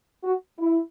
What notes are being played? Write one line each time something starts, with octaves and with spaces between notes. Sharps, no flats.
F#4
E4